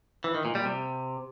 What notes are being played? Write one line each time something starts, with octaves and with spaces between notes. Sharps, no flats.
E3
D#3
A#2
G3
C3